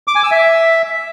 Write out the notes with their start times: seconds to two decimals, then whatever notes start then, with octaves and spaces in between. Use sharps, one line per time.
0.07 D6
0.15 G#5
0.23 E6
0.31 E5